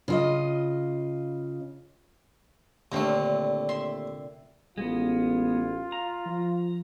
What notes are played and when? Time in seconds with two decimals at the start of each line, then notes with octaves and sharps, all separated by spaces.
0.08 C#3 F4 D#5
2.92 D#2 A#2 D3 A3 C4
3.69 E5 C6
4.78 A1 G#3 B3 F4
5.92 A#5
6.26 F3